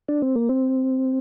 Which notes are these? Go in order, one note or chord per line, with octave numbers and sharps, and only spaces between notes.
D4
C4
A#3
C4